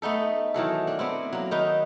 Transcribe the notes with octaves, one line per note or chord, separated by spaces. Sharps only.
A3 B3 D#4 A4
D#3 E3 F#3 A4
D4
B3 C4 E4
F#3 A#3
D#3 D#4 B4